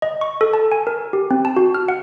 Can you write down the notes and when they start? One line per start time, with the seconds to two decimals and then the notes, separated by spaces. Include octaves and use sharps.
0.02 D#5
0.21 C#6
0.41 A4
0.53 A5
0.72 G#5
0.87 A#4
1.13 G4
1.31 C4
1.45 A5
1.57 F#4
1.75 F6
1.88 F#5